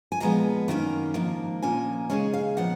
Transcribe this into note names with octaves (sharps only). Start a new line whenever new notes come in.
G#5
A#2 F3 G#3 B3 A#5
F#2 D#3 A#3 C#4 A#5
G#2 F3 A#3
A#2 F3 A#3 C#4 G#5
D#2 C#3 G#3 C#4 G#5
F5
A#2 F3 B3 F#5